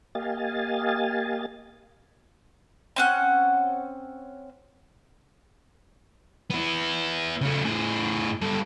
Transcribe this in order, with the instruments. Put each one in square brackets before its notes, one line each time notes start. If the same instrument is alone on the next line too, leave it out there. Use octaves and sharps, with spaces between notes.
[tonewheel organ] A#3 G4 D#5 F5 G#5 A6
[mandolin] C4 C#4 F#5
[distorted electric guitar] B3 E4
C#3 A3
A2 G#4
G2 A4